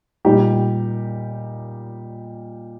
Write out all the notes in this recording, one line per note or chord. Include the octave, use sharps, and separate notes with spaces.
A#2 G3 D#4 G4